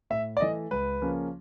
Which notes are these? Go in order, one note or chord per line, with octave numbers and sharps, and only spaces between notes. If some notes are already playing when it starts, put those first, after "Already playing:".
A2 E5
D5
E3 A3 D#5
C#2 B4
C#3 F3 A#3 C#4